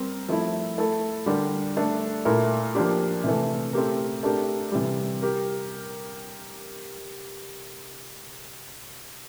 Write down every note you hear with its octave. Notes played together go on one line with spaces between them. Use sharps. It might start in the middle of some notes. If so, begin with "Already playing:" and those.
Already playing: G3 C4 G4 A#4
F3 A3 E4
A3 E4 A4
D3 G3 D4 G4 A#4
A3 D4 A4
A#2 A3 E4 A#4
F3 A#3 D4 G4
C3 E3 A3
A3 C4 G4 A#4
A3 D4 G4 A#4
C3 E3 G3
G4 A#4